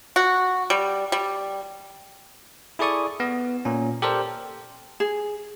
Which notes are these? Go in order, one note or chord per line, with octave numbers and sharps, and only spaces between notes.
F#4
G3
G3
E4 G#4 A4 D5 C#6 D#6
B3
A#2 C#4
G4 A4 A#4 C5 D5
G#4